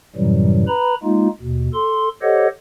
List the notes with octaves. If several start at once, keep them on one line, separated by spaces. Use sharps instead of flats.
F#2 A2 C3 E3 F#3 G3
B4 A#5 B5
G#3 A#3 D#4 F4
D#2 B2
A4 C6
G4 A4 C5 C#5 D#5 F#5